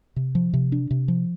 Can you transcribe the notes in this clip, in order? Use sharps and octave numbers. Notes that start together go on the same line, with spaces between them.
C3
F3
C3
D4
C3
F3